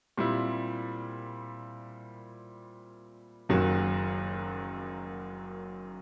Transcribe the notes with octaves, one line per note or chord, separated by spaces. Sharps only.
A#2 G3 C4 E4
F#1 F#2 D#3 F#3 A#3